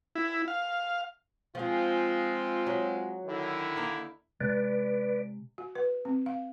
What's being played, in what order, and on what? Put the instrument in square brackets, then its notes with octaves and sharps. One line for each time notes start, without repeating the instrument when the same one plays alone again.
[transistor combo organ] E4
F5
[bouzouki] F3 G#4 [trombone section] G#3 C4 F4
[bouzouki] F#3
[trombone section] D3 D#3 E4
[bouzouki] A#3 D#4
[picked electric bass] C3 G#3 [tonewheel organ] B4 D5
[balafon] F#4
B4
C4
F5